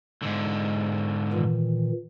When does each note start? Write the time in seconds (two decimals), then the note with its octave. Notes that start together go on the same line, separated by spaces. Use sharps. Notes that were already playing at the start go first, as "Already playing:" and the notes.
0.23 G#2 D3
1.33 A#2 D#3 E3